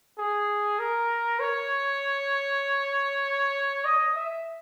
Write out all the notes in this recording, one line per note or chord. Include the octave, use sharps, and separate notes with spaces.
G#4
A#4
C#5
D#5
E5